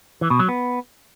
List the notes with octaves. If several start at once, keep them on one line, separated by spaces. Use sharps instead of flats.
E3
B2
F#3
B3